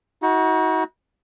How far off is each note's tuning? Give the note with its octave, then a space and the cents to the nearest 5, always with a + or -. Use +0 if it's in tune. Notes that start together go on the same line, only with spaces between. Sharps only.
D#4 +45 F#4 +0